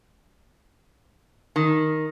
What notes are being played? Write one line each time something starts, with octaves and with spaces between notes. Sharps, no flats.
D#3